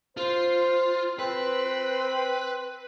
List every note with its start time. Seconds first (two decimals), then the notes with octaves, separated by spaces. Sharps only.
0.17 F4 C5
1.19 C4 B4